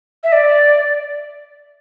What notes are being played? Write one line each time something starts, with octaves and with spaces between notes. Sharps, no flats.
E5
D5